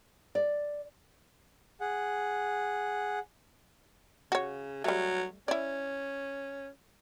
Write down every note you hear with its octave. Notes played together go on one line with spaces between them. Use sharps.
D5
G#4 F#5
C#3 F#4 C#5
F#3 G3 A3
C#4 E4 D5